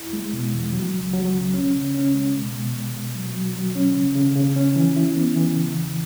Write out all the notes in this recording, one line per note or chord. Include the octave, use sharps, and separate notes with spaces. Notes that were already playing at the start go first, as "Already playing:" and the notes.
Already playing: E2 E4
G#3
B2
E2
F#3
C#2
F#3
C#2
C#4
C#3
C#4
G#3
B2
B2
B2
B2
F#3
F#3
F#3
C#4
C#3
C#3
C#3
C#4
E3
E4
B3
E3
C#3
E2